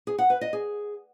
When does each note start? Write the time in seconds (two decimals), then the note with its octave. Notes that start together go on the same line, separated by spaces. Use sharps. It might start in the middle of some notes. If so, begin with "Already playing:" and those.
0.07 G#4
0.18 F#5
0.30 B4
0.41 D#5
0.53 G#4